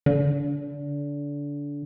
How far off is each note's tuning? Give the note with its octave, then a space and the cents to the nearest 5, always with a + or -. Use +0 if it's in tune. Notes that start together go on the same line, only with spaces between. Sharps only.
D3 -25